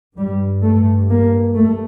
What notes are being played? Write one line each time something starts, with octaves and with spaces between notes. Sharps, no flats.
G2 G3
A3
A#3
A3